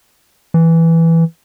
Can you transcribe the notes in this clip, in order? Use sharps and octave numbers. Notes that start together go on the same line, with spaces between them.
E3